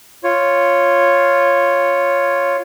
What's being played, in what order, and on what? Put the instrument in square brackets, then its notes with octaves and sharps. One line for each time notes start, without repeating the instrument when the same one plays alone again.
[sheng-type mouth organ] F4 C#5